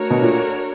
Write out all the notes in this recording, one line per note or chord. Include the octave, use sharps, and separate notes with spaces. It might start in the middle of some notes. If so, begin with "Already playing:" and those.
Already playing: A3 D4 F#4 A#4 C#5
B2
A#2